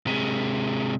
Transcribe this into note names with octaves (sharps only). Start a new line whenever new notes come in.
C3 G#3